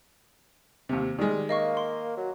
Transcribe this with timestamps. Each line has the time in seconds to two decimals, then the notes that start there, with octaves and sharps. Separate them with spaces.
0.89 D#2 C3
1.18 D#3 G3 G#3
1.49 A#3 D#5 F5 C#6
1.77 C6
2.17 F#3